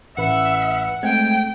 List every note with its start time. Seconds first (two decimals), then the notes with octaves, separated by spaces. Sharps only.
0.17 A1 B4 E5 F#5 B5
1.03 G#3 A3 C4 G5 G#6